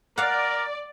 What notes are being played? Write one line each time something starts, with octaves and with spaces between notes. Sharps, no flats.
A#4 D5 F5 F#5